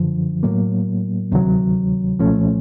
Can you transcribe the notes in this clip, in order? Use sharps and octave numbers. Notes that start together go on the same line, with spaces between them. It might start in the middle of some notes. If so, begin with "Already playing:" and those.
Already playing: F#2 D3 F3
A2 F#3 A#3
D2 C3 D#3 F#3
C2 A#2 F3 A3 C#4